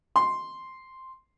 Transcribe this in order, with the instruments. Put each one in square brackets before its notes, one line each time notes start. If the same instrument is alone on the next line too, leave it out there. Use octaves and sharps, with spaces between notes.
[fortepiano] C6